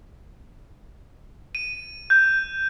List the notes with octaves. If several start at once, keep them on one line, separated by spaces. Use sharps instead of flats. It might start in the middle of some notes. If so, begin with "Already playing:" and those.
D#7
G6